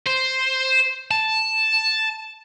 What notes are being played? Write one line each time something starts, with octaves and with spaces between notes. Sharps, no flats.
C5
A5